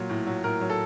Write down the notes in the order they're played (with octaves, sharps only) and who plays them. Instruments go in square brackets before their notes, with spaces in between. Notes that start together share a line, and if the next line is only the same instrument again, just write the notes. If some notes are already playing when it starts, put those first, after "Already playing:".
Already playing: [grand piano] A#2 F#3
A2
F#3
A2 A#4
F#3
A4